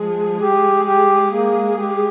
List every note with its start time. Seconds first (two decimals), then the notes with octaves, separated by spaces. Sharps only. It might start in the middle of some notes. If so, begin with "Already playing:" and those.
Already playing: F3 G#3 G#4
0.40 G4
0.85 G4
1.30 A#3
1.76 G4